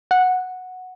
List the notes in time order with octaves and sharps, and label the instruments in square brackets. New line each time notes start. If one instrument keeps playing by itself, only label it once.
[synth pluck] F#5